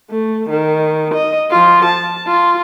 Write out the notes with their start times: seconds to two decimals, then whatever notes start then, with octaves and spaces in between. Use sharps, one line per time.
0.10 A3
0.49 D#3
1.14 D#5
1.50 F3 F4
1.85 A5
2.27 F4